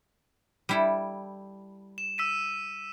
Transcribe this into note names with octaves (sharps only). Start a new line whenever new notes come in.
G3 E4 A4
E7
E6 B6 D#7